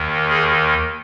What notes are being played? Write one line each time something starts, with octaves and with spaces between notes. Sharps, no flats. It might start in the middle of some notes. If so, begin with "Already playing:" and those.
Already playing: D#2 D#3
G#4